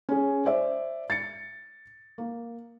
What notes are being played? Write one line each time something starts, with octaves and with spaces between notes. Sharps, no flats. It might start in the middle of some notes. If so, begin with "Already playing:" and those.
C#4 G#4
C5 D5 E5
A6 C#7
A#3